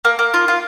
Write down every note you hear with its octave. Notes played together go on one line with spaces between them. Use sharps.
A#3
A#3
F4
F4